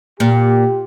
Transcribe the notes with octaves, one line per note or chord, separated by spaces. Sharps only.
A#2 G4